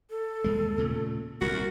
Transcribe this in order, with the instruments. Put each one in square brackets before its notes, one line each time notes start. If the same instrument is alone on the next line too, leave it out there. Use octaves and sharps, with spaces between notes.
[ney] A4
[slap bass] D#2 G#3
A#2 C#3 A3
[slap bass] D#1 C2 A#2 [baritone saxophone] F#4 [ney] A#4